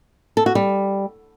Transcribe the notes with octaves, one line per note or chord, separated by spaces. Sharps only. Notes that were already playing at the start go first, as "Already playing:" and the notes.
A4
F#4
G3